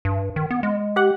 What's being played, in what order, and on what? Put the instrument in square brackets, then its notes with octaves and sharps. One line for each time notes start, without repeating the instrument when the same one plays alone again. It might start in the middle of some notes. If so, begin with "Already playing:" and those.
[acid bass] G2
D#3
B3
G#3
[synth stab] G4 F#5